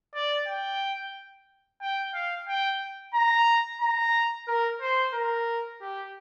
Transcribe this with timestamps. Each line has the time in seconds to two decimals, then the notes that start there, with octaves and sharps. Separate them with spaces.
0.15 D5
0.47 G5
1.82 G5
2.14 F5
2.48 G5
3.14 A#5
3.81 A#5
4.48 A#4
4.81 C5
5.14 A#4
5.81 G4